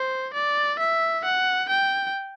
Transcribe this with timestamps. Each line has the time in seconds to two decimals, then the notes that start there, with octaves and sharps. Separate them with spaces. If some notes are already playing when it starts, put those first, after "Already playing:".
Already playing: C5
0.34 D5
0.79 E5
1.24 F#5
1.69 G5